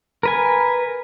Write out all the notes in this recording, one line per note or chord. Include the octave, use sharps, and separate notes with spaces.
A#4 B4 G#5